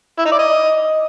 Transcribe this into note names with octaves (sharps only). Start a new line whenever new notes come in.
E4
D#4
D5
D#5